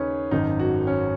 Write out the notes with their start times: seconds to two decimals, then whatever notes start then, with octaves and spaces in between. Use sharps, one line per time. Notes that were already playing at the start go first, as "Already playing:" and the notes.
Already playing: D#2 C#3 C#4 D#4 G#4 B4
0.31 G#1 F#2 D#3 D#4
0.59 F#4
0.87 C#4